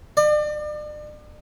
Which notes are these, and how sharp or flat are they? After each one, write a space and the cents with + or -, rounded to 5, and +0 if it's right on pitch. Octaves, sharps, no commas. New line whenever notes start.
D5 +40